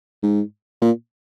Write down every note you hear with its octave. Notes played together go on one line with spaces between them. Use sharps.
G#2
A#2